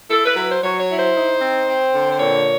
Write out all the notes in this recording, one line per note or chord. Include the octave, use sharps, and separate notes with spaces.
E4 A4
B4
F#3 B4
C5
F#3 C#5
C#5
E4
C5
D#4
C4
C4
D3
C5
A#2 C#5